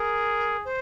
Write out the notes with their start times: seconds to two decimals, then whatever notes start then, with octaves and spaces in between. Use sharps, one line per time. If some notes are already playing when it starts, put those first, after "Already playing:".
Already playing: G#4 A#4
0.65 C5